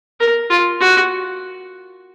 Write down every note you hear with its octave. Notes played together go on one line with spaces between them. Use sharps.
A#4
F4
F#4